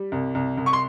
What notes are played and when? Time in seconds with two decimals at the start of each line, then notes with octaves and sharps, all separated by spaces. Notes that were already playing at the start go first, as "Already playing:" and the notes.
Already playing: G3
0.12 C2
0.35 C2
0.57 C2
0.66 C#6
0.73 C6